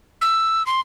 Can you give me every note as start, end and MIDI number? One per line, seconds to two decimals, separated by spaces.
0.21 0.65 88
0.66 0.81 84